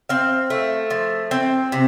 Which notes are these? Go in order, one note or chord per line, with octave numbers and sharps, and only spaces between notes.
C4 F5
A3
F3
C4
C3